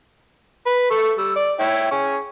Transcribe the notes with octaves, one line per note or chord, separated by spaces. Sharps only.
B4
A4 C#6
G3 E6
D5
E4 C#5 G5
C#4 G#4 C#6